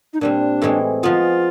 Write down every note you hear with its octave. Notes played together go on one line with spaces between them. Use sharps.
D#4
A#2 G3 C4 D4
A2 E3 G#3 C4
F3 G#3 B3 F4